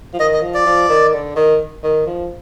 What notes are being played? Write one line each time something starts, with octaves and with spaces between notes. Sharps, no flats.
F3
D#3 D#5
D#5
F3
D5
F3
D#3
D3
D#3
D#3
F3